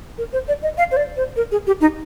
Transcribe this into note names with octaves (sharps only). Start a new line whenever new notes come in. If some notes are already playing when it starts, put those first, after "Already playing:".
A#4
C5
D5
D#5
F5
C5
D5
C5
A#4
G#4
G4
D#4